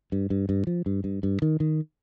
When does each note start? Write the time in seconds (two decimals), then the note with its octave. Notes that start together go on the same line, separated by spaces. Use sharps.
0.12 G2
0.30 G2
0.49 G2
0.67 F3
0.86 G2
1.04 G2
1.23 G2
1.42 D#3
1.60 D#3